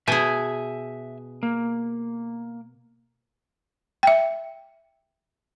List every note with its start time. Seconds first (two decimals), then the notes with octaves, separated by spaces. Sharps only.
0.08 B2 G#4 E5 G#5
1.43 A#3
4.03 E5 G5